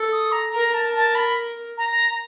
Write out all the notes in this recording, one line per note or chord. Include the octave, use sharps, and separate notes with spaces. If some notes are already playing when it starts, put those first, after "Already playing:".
Already playing: A4
D#6
A#5
A#4 A#5
A5
A5
B5
A#5